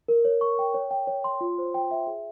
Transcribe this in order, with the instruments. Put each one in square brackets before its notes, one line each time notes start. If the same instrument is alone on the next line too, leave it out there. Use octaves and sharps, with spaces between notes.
[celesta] A#4
C#5
C#6
G5
C#5
G5
C#5
C6
F4
C5
G5
E5
G#4